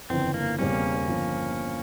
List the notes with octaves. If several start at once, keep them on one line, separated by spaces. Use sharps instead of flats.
G1 F2 C#3 E3 C4
A#3
E1 E2 C#3 G3 A#3 C4 C#4
G1 F3